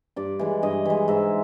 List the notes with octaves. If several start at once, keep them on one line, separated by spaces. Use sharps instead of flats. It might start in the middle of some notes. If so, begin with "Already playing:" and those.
G2 D5
E3 G#3
G2 D#5
E3 G#3
G#2 E5